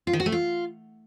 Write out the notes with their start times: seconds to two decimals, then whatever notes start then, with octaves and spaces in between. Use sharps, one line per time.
0.07 F4
0.13 D#3
0.20 F#4
0.26 A3
0.32 F4